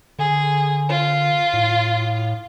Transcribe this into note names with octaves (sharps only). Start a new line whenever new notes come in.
D3 G#4
F4
A2